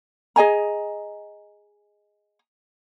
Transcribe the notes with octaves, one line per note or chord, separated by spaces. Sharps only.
G#4 D#5 G#5 A#5